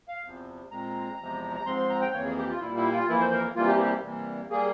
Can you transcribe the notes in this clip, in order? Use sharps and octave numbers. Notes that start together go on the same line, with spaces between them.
F5
E2 C3 F3
A#2 G#3 C4 A#5
E2 C3 F3 G#3
A#5
G#2 F3 G#3 C4 C6
C6
A#5
G5
F2 E3 A#3 C#5
G#4
G4
F4
A#2 G3 A#3 E4
E4
F4
F2 E3 A#3 E4
C5
A#4
C3 E3 G3 A#3 F4
G4
G4
C3 E3 G3 A#3
G3 A#3 G#4